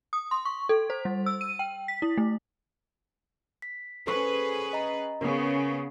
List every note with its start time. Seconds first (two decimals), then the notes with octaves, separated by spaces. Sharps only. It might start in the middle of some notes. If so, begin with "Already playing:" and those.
0.13 D#6
0.31 C6
0.45 C#6
0.69 A4
0.90 C5
1.05 G3
1.26 E6
1.41 D#7
1.59 G5
1.88 B6
2.02 E4
2.17 A3
3.62 B6
4.07 C#4 G#4 A4 B4 C5 C#6
4.73 D#5 A#5
5.21 C#3 B3 A#4